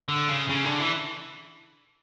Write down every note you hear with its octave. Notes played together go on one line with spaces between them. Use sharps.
D3
C#3
C#3
D3
E3